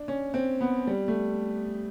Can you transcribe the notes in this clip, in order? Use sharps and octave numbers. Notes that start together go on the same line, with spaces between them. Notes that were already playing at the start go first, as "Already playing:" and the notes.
Already playing: D4
C#4
C4
B3
G3
A3